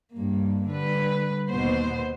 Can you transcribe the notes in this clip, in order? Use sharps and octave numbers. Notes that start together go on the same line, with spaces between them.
G2 A#3
D3 G3 B4
D#2 B2 B3 C5